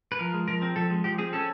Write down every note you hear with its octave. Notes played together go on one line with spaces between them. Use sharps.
B4
F3 A#4
G#3
F3 A#4
C4
F3 A4
G#3
F3 G4
C4 G#4
C#4 A4